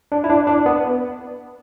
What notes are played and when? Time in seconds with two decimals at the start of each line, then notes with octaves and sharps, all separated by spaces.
0.12 D4
0.24 E4
0.30 D4
0.47 D4
0.66 B3